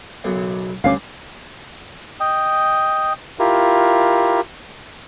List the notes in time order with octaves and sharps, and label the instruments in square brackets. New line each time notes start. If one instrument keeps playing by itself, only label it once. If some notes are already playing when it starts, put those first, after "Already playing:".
[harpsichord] B1 F#2 C#3
[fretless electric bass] D2 C#4 [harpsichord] G2 G#5 D6 [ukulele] F5
[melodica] D#5 G5
E4 F4 G4 A#4